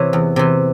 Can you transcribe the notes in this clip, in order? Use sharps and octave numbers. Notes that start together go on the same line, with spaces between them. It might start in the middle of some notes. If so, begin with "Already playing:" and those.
Already playing: C3 E3 C#5
E2
C3 E3